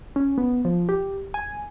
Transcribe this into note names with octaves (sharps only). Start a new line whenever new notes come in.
C#4
B3
F3
G4
G#5